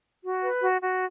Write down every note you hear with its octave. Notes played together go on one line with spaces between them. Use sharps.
F#4
B4
F#4
F#4